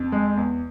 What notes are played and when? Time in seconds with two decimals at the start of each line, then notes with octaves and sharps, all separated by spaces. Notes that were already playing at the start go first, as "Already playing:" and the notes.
Already playing: F2
0.12 G#3
0.37 E2